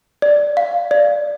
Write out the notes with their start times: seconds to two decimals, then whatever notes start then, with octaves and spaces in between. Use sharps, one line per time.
0.22 D5
0.57 F5
0.91 D5